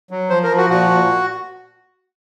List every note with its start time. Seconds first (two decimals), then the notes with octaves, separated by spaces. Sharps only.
0.11 F#3
0.30 F3 C5
0.44 A#4
0.50 F3
0.57 F#4
0.70 A#2 F#4
0.90 A#2